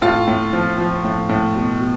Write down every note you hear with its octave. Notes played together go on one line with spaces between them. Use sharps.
A2 F4
A2
F3
F3
A2
A2
B2
B2